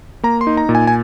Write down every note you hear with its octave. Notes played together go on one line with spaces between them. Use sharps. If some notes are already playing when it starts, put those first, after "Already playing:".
A#3 A#5
C6
D#4
A#5
A#2
G#5
G#5